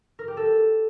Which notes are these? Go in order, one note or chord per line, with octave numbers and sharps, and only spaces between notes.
A#4
G4
A4